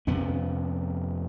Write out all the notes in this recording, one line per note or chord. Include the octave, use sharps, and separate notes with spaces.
F2 C3 B3 C#4